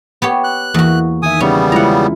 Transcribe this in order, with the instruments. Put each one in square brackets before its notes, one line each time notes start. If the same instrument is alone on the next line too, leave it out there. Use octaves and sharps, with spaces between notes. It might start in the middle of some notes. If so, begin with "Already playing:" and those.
[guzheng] B3 G4 C#5
[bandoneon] F#6
[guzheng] E2 F#4 [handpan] E3 A#3
[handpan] D#3 E5 [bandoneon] G#5 D#6
[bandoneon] C#3 G3 B3 [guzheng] C#4
[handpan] G#3 E4 F4 [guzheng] F#5 A#5